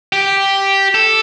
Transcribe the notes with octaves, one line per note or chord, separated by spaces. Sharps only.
G4
A4